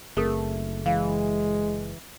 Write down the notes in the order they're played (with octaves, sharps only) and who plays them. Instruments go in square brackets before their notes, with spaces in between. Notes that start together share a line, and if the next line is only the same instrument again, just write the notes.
[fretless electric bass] F#1 C4 [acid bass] A3 [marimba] G#4 A#4 D#6
[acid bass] E3 [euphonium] G#3 [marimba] F5